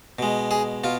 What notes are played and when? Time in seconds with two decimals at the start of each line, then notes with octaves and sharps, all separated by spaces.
0.19 B2 G#3
0.51 G#4
0.84 B2 F4